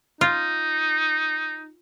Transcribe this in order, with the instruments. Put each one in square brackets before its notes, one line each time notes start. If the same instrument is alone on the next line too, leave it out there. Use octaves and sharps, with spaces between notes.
[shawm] D#4 [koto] F4